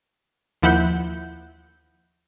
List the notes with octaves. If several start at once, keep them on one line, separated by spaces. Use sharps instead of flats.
D#2 F3 E4 F#5 G6